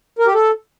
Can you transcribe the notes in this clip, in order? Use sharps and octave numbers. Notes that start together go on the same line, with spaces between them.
A#4
G4
A4